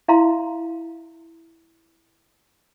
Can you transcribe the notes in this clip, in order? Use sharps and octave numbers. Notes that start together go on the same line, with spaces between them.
E4 E5 F5 A#5 C6